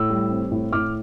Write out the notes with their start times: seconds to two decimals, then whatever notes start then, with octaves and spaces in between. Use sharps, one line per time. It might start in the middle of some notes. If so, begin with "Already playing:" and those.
Already playing: A2 E6
0.10 G3
0.30 C4
0.51 A2
0.72 A2 D6 F6